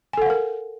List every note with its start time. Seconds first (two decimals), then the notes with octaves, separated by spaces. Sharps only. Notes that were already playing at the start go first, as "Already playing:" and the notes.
0.13 G#5
0.18 A4
0.22 F#5
0.26 F5
0.30 A#4